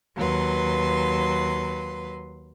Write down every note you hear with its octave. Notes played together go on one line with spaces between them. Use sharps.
D#2 F#3 B4 C6